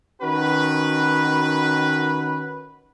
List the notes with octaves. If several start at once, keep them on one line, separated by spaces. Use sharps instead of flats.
D#3 C#4 F#4 B4